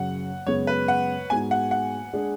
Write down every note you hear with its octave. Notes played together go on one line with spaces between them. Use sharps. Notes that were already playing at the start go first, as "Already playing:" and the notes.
Already playing: F#2 C#3 F#3 F#5
F#2 C#3 G#3 B3 C#5
B4
F#5
G#2 G#3 B3 F#4 G#5
F#5
F#5
G#3 D4 G#4